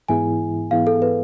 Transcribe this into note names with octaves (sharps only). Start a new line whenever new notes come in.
G#2 E3 B3 E4 G#4 G#5
G#2 E3 B3 E4 G#4 F5
A4
B4